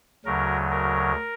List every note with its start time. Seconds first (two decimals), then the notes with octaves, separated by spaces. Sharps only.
0.25 D2 C#3 F#3 A#4
0.71 A#4